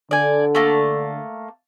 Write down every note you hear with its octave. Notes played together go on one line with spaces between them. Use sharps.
D3 D5 G#5
A3 A#3 A5